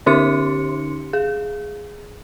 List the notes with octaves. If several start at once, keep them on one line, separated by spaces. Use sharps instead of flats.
D3 C#4 D#4 G4 C6 C#7
G#4